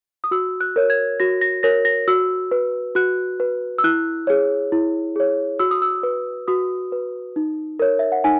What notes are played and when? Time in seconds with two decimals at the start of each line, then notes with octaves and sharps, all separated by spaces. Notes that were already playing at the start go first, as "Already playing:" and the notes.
0.24 D#6
0.31 F#4 E6
0.61 F#6
0.76 A#4 C#5
0.90 G#6
1.20 F#4 A#6
1.41 A#6
1.63 A#4 C#5 A#6
1.85 A#6
2.08 F#4 E6
2.51 B4
2.95 F#4 F#6
3.40 B4
3.78 E6
3.84 E4 F#6
4.27 G#4 C#5
4.72 E4
5.16 G#4 C#5
5.59 F#4 E6
5.71 D#6
5.82 E6
6.03 B4
6.48 F#4 D#6
6.92 B4
7.36 D#4
7.79 A#4 C#5
7.99 E5
8.12 F#5
8.24 D#4 G#5